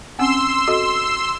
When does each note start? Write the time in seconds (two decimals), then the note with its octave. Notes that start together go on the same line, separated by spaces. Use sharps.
0.19 C4 C#4 F#5 C6 E6
0.67 F#4 A4 D#5